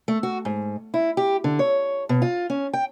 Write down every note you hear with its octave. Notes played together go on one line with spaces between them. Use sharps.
A3
F#4
G#2
E4
G4
D3
C#5
B2
F4
C#4
G5